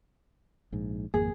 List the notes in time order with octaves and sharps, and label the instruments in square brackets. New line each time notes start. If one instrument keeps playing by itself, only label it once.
[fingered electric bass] A#1 G#2
[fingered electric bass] G#1 F2 A#3 [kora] G#4